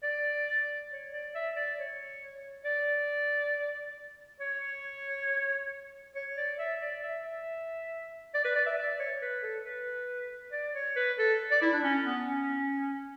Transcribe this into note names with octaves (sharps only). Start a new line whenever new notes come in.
D5
C#5
D5
E5
D5
C#5
D5
C#5
C#5
D5
E5
D5
E5
E5
D5
B4
D5
E5
D5
C#5
B4
A4
B4
D5
C#5
B4
A4
D5
E4
D4
C#4
B3
C#4